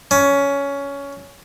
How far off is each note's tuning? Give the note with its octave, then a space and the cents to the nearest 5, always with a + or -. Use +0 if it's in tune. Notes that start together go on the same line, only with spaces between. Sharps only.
C#4 +15